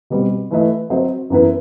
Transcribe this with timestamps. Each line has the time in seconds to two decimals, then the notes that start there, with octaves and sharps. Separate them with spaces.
0.10 B2 G3 C4
0.51 E3 A3 E4 B4 D#5
0.90 F#3 C4 F#4 C5 D#5
1.30 F#2 E3 B3 E4 B4